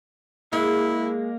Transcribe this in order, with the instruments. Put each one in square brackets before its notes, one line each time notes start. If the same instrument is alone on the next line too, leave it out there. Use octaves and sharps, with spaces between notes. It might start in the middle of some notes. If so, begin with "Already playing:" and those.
[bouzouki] G#3 [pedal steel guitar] A#3 [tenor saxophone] E4